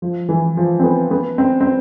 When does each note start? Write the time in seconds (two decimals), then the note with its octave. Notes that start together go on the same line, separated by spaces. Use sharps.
0.02 F3
0.29 E3
0.57 F3
0.80 C4
0.84 B3
1.11 B3
1.38 C4
1.61 C4